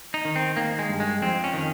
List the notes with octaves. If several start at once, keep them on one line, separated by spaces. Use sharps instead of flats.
D#4
D#3
C4
D#3 A#3
G#3
G2
G#3
F2 C4
C#4
D#3